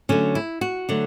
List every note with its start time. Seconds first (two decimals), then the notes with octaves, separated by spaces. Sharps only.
0.09 D3 F#3 A3 C#4
0.35 E4
0.61 F#4
0.89 D3 F#3 A3